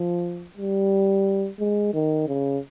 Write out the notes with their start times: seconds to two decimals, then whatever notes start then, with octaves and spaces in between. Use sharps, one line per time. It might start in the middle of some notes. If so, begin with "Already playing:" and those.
Already playing: F3
0.58 G3
1.59 G#3
1.94 D#3
2.28 C#3